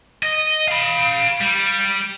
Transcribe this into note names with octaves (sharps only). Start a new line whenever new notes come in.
D#5
F5 B5
G3